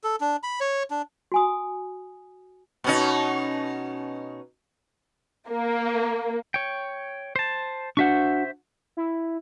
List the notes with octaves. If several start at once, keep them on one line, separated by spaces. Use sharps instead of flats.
A4
D4
B5
C#5
D4
F#4 G#5 D#6
B2 C#4 D#4
A#3
C#5 G5
C5 A5
D4 F#4 C5 E5 F#5 C#6
E4